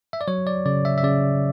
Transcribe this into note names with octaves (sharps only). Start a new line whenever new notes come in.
E5
D5
F#3 C#5
D5
C#3 D5
E5
E5
C#3 D5